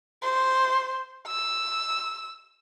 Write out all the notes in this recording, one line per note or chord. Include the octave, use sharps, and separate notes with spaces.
C5
E6